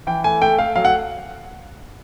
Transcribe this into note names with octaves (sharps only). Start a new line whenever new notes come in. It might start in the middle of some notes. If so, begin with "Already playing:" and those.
E3 G5
A3 G#5
A3 G5
A3 F5
F#3 F5
F#5